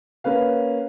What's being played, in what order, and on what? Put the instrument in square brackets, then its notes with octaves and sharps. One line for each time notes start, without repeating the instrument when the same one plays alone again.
[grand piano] A#3 C#4 B4 F5